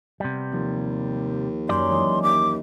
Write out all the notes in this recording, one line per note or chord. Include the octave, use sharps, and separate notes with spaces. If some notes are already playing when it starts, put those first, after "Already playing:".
C3 G3 B3
D#2 F3
F#2 C#4 D5 C6 G6
E3 G#3 D#5
D#2 D6